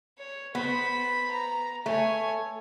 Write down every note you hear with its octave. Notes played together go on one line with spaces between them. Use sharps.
C#5
B3 C5 B5
A#5
A3 C#5 G#5